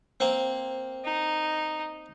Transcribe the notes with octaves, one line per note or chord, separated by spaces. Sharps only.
A#3 C4
D#4